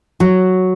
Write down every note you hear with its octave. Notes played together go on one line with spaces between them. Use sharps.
F#3